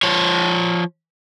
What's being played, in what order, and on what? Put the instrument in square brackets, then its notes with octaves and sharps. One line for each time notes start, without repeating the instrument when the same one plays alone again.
[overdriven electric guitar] F3 C#5